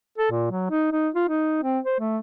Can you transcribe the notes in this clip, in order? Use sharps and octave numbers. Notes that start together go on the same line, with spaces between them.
A4
A#2
F#3
D#4
D#4
F4
D#4
C4
C5
A3